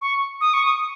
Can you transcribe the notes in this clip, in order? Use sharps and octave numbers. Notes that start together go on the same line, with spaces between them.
C#6
D#6
C#6
D#6